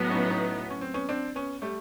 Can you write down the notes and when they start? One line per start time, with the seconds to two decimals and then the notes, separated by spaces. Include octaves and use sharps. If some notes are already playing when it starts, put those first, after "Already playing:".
Already playing: A2 F#3 B3
0.10 C#4 D#4
0.30 C#4 D#4
0.70 C#4
0.81 C4
0.94 B3 C#4
1.09 C4 D4
1.36 B3 C#4
1.62 G3 A3